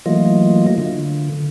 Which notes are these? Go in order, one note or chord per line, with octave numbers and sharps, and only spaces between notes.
E3 F#3 A3 A#3 F4 D#5
D3